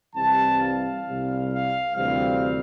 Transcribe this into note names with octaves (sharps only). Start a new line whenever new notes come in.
C2 C3 E3 G3 A5
F5
C2 C3 G3
F5
D2 C3 E3 G3 C4 F5